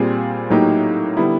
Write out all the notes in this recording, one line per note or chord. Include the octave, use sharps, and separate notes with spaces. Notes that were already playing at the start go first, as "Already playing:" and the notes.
Already playing: A#2 G3 C4 F4 G#4
A2 F#3 A#3 D#4 G4
D3 G3 B3 E4